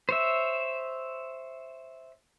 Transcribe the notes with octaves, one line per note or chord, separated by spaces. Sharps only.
C5 C#5 E5